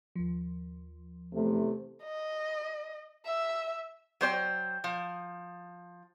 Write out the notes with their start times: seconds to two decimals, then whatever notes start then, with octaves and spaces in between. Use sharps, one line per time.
0.16 D#2 F3
1.33 E2 C3 A3
2.03 D#5
3.25 E5
4.21 F#3 C5 C#5 G5
4.84 F3